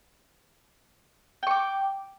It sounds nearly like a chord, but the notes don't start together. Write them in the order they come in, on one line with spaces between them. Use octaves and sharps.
G5 C#6 D6